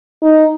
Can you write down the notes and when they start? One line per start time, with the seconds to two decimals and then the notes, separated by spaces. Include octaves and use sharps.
0.22 D#4